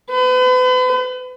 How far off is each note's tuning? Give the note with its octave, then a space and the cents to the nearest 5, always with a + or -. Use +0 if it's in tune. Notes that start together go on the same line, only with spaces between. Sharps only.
B4 +40